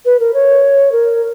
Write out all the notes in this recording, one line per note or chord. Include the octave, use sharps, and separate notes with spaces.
B4
A#4
C#5
A#4